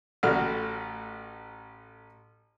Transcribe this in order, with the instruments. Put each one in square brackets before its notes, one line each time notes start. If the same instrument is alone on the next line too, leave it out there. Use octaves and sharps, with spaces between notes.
[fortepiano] A1 A2 A3 F#4 F6